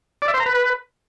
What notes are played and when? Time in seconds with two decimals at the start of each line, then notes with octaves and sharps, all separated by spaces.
0.22 D5
0.28 E5
0.34 C5
0.40 A#5
0.46 B4